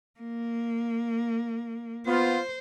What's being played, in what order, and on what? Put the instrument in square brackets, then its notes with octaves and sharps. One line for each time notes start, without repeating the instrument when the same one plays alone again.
[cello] A#3
[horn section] B3 F4 [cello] C5